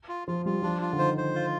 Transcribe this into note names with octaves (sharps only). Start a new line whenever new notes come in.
F4
F3 F4
G3 F4
F3 D4
F4
D3
D#3 C5
C5
F4